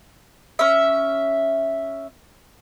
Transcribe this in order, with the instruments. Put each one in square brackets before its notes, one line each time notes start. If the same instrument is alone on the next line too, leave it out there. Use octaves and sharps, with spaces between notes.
[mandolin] C#4 E5